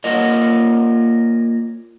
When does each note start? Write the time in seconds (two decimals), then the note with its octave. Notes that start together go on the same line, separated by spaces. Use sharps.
0.04 A#3 F4 A#4 C#5 D#5